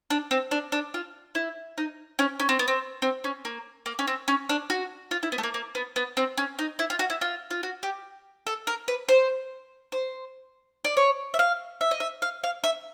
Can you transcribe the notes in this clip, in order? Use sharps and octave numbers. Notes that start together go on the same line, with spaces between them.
D4
C4
D4
D4
F4
E4
D#4
C#4
C#4
C4
B3
C4
C4
C#4
A#3
A#3
C#4
C4
C#4
D4
F#4
F4
E4
B3
A3
A#3
A#3
B3
B3
C4
C#4
D#4
E4
F4
F#4
E4
F4
F4
F#4
G4
A4
A#4
B4
C5
C5
D5
C#5
E5
F5
E5
D#5
E5
F5
F5
E5